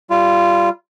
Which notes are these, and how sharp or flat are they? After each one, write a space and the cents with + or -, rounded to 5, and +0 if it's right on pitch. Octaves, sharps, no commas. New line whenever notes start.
G3 -10 F4 -15